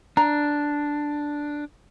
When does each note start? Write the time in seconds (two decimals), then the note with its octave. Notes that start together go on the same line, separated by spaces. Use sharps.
0.17 D4 A#5